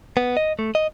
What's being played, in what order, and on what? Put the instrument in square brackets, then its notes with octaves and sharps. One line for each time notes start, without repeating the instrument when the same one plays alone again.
[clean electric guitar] B3
D#5
A3
D#5